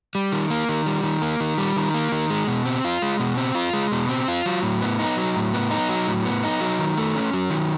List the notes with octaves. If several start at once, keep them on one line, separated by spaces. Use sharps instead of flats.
G3
D#3
A#3
D#3
G3
D#3
A#3
D#3
G3
D#3
A#3
D#3
G#3
B2
C4
F4
G#3
B2
C4
F4
G#3
B2
C4
F4
F#3
A2
B3
D#4
F#3
A2
B3
D#4
F#3
A2
B3
D#4
F#3
D#3
A3
C#4
F#3
D#3